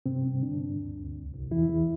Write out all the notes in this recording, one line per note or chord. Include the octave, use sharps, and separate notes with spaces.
G2 C3 C4
G2
G2 D3 D4
G2
D2
D2
C2
C2
E2 E3 E4
E2